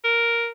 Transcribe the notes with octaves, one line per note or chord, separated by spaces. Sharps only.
A#4